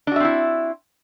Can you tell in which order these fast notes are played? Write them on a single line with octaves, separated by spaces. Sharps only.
D4 F#4 E5 C4 E4